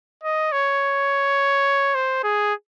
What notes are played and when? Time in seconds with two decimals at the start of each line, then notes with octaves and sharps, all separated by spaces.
0.23 D#5
0.52 C#5
1.95 C5
2.24 G#4